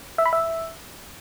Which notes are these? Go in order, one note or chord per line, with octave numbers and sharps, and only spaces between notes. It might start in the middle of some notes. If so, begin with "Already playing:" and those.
E5
B5
E5